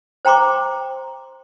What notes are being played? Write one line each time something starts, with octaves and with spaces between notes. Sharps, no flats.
C5 G5 A#5 C6 D6